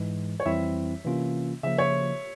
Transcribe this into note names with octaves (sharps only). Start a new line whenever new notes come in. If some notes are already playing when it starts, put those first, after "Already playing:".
Already playing: G#2 E3 G#3
C#5
F2 E3 G3 C4 E4 E5
C3 E3 A#3 C#4 F4
C#3 F3 A#3 E5
C#5